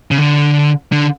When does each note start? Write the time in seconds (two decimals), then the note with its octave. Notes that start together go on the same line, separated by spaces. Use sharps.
0.11 C#3
0.18 D3
0.92 D3